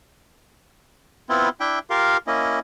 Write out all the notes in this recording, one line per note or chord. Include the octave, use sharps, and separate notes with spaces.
B3 C4 E4 F4
D4 E4 E5 G5
F4 G4 A#4 F5
A#3 C#4 E4 D#5